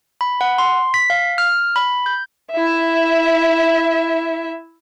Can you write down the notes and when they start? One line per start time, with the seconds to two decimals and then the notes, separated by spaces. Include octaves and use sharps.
0.21 B5
0.41 F#5
0.58 C6
0.94 B6
1.10 F5
1.38 F6
1.76 B5
2.06 G6
2.52 E4 E5